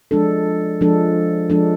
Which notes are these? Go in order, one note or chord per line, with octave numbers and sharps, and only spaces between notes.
F3 G#3 D4 A4
F3 G#3 D4 A4
F3 G#3 D4 A4